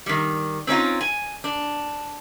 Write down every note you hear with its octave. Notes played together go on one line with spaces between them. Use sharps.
D#3 G3
C4 C#4 D#4 F4
G#5
D4